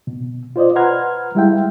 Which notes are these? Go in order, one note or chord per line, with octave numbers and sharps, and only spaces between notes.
B2
F4 C5 D5 D#5
B4 F#5 A#5 C6 F6 G#6
G3 G#3 E4 E5 F5 G5